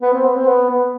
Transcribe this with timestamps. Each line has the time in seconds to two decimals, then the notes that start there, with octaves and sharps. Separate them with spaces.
0.02 B3
0.13 C4
0.24 B3
0.35 C4
0.46 B3
0.70 B3